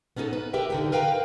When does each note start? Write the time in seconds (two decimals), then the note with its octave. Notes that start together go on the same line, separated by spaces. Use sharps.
0.16 B3 C#4 D#4 G4 A4
0.33 B4
0.53 G4 A#4 B4 E5 G5
0.70 D3 D#4 G4
0.92 A#4 B4 F5 G5 G#5 A#5